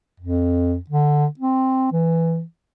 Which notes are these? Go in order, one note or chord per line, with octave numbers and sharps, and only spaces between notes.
F2
D3
C4
E3